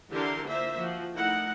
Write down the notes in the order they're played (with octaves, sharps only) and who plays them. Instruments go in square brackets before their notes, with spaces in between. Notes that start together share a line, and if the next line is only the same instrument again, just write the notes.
[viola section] D3 E3 D4 G4 A#4 C6
A#3 F4 C5 E5
F3 F#4
A3 D#4 E4 A#4 F#5